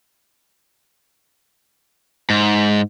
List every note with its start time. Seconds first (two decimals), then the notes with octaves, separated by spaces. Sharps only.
2.30 G#2